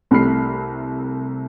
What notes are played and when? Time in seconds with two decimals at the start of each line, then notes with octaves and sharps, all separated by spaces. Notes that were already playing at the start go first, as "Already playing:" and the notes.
0.11 C2 C3 A3 B5 F6 C7